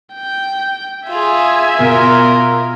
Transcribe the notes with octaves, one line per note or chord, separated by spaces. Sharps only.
G5
F4 G#4 E5 G#5
B2 F4 A#4